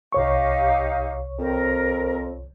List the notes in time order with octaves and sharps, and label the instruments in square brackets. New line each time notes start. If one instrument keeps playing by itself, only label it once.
[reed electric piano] C2 C#5 C#6 [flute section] D#4 G4 F5
[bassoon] F2 [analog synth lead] C4 [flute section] A#4